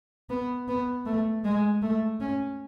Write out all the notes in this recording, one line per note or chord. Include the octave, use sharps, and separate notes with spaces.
B3
B3
A3
G#3
A3
C#4